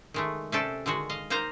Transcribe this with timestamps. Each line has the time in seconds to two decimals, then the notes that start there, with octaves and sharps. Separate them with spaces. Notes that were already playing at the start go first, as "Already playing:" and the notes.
0.14 D#3 G#3 A3
0.52 C3 C#4 D4 G4 A4
0.86 D3 D#3 G#3 F#4
1.10 D#5 F5
1.30 A#3 D#4 C5 F5 A#5